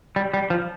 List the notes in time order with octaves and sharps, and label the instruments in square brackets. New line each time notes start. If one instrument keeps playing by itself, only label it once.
[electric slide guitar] G3
G3
F3